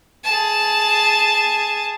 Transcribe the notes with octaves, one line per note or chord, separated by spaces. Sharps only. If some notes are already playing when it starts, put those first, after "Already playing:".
G#4 A5